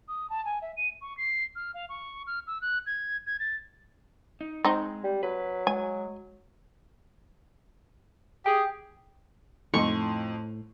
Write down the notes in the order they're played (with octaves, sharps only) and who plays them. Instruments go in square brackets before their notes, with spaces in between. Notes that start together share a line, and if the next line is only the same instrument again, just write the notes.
[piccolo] D#6
A5
G#5
E5
D#7
C#6
C7
F6
F5
C#6
F6
E6
F#6
G#6
G#6
A6
[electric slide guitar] D#4
[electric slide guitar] G#3 [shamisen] C4 D#4
[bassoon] G3
[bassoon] F#3 [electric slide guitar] B4
[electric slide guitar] G#3 [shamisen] G#5
[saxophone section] G4 G#4 [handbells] G5
[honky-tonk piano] F2 D#4 C6 [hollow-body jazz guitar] A2 A3 [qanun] C#6